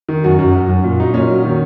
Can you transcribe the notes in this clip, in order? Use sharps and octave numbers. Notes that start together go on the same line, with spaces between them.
D#3
F#2 F#4
F#2
F#2
F#2
A#2
F#3 D#4
A#2 C#4
F#3
D#3